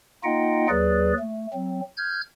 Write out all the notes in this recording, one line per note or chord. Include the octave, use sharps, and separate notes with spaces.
A#3 D#4 F4 D#5 F#5 G5
D#2 F#3 G#4 B4 D5
A3
F#3 C4
F6 G6 G#6